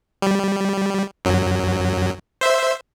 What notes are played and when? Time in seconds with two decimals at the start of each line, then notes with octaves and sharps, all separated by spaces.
0.22 G3
1.25 F#2 F#3
2.41 C5 E5